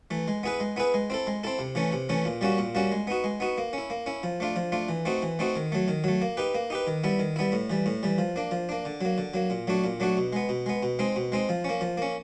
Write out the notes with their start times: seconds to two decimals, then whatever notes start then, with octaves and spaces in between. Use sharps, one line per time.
0.11 E3 A3
0.28 G#3
0.43 B3 E4 G#4 B4
0.60 G#3
0.76 B3 E4 G#4 B4
0.94 G#3
1.10 C4 E4 A4
1.27 G#3
1.43 C4 E4 A4
1.59 C3
1.75 E3 A3 C#4
1.92 C3
2.09 E3 A3 C#4
2.25 A#2
2.41 G3 A#3 C#4 F#4
2.58 A#2
2.75 G3 A#3 C#4 F#4
2.92 G#3
3.07 B3 D#4 F#4
3.24 G#3
3.40 B3 D#4 F#4
3.58 A#3
3.73 C#4 E4
3.90 A#3
4.06 C#4 E4
4.23 F3
4.40 A3 D4 F4
4.56 F3
4.72 A3 D4 F4
4.89 E3
5.05 A3 C4 D#4 F#4
5.22 E3
5.39 A3 C4 D#4 F#4
5.56 D#3
5.72 F#3 A3
5.88 D#3
6.04 F#3 A3
6.22 A#3
6.37 D#4 G4 B4
6.55 A#3
6.70 D#4 G4 B4
6.87 D#3
7.04 G3 B3 E4
7.19 D#3
7.36 G3 B3 E4
7.52 A2
7.70 E3 G3
7.86 A2
8.03 E3 G3
8.18 F3
8.36 A#3 D4
8.51 F3
8.69 A#3 D4
8.85 D3
9.01 F#3 A#3
9.18 D3
9.34 F#3 A#3
9.50 A#2
9.67 F#3 A3 D4 F#4
9.84 A#2
10.00 F#3 A3 D4 F#4
10.17 B2
10.33 G#3 B3
10.49 B2
10.66 G#3 B3
10.83 B2
10.99 G#3 C4 D#4
11.16 B2
11.32 G#3 C4 D#4
11.49 F3
11.64 A#3 C#4
11.81 F3
11.97 A#3 C#4